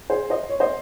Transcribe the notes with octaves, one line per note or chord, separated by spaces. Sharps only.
G#4 C5
C5 D#5
C#5
C5 D#5